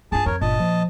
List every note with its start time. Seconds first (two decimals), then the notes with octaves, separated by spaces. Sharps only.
0.12 G2 F4 G#4 A5
0.26 F2 A#4 C#5 G#6
0.41 G1 A#2 D#5 A5
0.60 A#2 F3